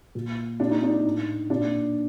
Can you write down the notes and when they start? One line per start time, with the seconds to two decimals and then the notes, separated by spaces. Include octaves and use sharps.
0.15 A#2
0.60 A#2 D4
0.71 D#4
0.83 D4
0.93 D#4
1.05 A2
1.50 A#2 D4